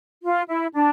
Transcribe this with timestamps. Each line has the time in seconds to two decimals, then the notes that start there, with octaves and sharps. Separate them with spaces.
0.23 F4
0.48 E4
0.74 D4